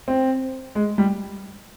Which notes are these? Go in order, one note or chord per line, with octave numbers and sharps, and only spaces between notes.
C4
G#3
G3